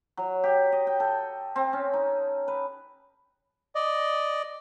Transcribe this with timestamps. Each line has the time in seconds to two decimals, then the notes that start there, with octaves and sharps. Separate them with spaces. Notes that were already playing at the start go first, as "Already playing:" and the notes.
0.17 F#3
0.44 G4
0.72 D#5
0.87 G5
1.00 A4
1.56 C4
1.73 C#4
1.93 D#4
2.48 B4
3.75 D5 D#5